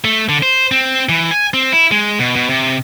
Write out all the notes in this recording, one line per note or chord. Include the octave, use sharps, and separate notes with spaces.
A3
D3
C5
C4
E3
G#5
C4
E4
G#3
B2
B2
C3